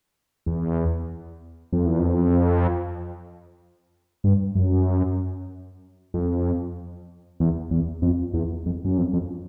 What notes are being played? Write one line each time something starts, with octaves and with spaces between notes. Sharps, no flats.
E2
F2
E2
F2
G2
F#2
F2
E2
E2
F2
E2
F2
F#2
F2
F2